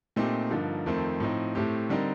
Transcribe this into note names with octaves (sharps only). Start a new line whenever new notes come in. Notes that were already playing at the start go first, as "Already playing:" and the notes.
A#2 A3 C4 D#4 G4
G2 D3 F3 A#3 D#4
F2 D#3 A3 C4
A2 F3 C4 D#4
A2 A3 C4 G4
D3 G3 C4 D#4 A#4